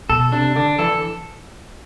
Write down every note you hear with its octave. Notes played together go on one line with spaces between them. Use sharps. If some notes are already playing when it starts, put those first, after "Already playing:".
B2 A4
C3 D4
D3 D4
E3 A4